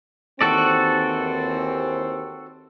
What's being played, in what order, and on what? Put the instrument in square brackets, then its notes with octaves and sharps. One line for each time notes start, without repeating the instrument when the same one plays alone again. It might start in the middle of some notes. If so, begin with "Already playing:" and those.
[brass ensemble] D#2 E3 C4 [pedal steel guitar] F#4 A4 D5